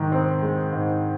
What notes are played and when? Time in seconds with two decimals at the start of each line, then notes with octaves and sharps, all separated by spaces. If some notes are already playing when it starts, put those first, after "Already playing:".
Already playing: G#2 D#3 G#3
0.12 C4
0.42 G#3
0.73 G#2